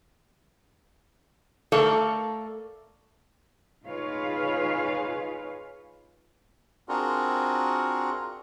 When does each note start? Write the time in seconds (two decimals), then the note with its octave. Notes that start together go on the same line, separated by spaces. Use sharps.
1.72 A3 A4 A#4 D5 F5 A5
3.84 D#4 F4 G#4 B4 C#5 F5
6.89 C4 D4 F4 F#4 G#4 A#4